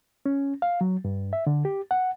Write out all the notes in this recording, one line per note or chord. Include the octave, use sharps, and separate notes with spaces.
C#4
F5
F#3
G2
E5
D3
G4
F#5